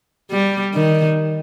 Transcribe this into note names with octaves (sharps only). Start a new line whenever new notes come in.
G3
D#3